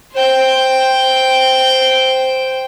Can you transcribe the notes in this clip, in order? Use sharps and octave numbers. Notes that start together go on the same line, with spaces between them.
C5 G5